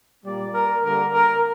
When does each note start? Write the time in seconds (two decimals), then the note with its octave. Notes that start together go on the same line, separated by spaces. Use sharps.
0.24 A#2 G3 A#3 D5
0.54 A#4
0.84 D3 G3 A#3 A#4
1.14 A#4